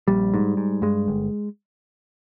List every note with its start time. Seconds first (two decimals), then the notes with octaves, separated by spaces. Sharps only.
0.08 A#1 G3
0.34 G#2
0.57 G#2
0.82 G2 G#3
1.08 G1